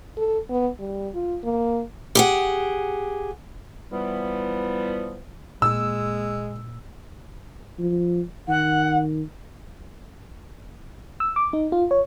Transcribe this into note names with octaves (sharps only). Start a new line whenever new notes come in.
A4
B3
G3
F4
A#3
G4 G#4 F#5
E3 F3 G3 B3
A#2 G#3 E6
F3
D#3 F#5
E6
D6
D#4
F4
C#5